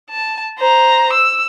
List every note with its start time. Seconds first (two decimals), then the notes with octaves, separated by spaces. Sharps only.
0.10 A5
0.59 C5 A#5
1.13 E6